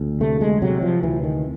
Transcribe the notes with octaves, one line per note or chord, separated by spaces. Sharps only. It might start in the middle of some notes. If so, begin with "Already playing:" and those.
Already playing: D2
C3 A3
G#3
C3 F#3
F3
D2 E3
D#3